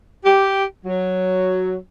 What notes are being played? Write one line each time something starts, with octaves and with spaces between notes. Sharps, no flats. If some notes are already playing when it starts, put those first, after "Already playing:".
G4
F#3